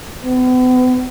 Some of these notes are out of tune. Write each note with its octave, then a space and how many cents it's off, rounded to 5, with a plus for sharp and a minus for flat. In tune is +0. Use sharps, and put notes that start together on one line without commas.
B3 +40